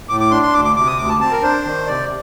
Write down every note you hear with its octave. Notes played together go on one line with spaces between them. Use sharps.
A2 D6
D6
D4 C6
C6
D2 D6
D6
C3 D6
D#6
D2 D6
A5
C4 A5
A#4
D4 C5
D#3
C3 D5